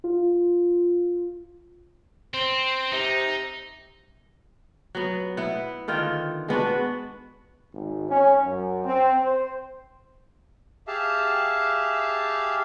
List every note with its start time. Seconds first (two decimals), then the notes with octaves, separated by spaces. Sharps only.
0.04 F4
2.34 C4 C5
2.92 C3 D#4
4.95 F#3 B3
5.37 B3 E4
5.88 D3 D#3 F4
6.48 G#3 B3 D4 F#4
7.74 G#1
8.10 C#4
8.44 F#2
8.85 C4
9.22 C5
10.87 G4 G#4 E5 F5 A5